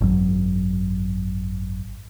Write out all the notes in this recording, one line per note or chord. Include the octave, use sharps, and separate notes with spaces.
G#1 F#2 F#3